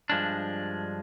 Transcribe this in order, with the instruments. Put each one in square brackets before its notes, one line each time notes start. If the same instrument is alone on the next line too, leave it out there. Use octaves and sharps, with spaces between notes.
[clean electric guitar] G2 F3 G#3 D4